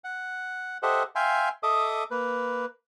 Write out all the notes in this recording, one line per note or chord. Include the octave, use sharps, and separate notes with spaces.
F#5
G4 A4 C5 D#5 E5 F#5
E5 F5 G5 G#5 C6
A4 D#5 E5 D6 D#6
A#3 B4